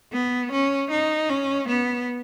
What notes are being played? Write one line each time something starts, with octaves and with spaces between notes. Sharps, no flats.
B3
C#4
D#4
C#4
B3